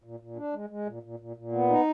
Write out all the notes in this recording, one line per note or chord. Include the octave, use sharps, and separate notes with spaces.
A#2
A#2
D4
G#3
G#3
A#2
A#2
A#2
A#2
B3
D#4